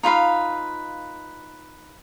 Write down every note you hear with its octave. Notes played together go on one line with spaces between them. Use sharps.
D#4 F4 B4 F5